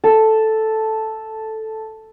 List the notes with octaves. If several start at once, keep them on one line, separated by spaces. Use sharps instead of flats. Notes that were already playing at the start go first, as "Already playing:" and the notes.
A4